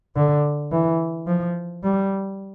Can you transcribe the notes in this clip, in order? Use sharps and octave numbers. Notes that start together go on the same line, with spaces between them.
D3
E3
F3
G3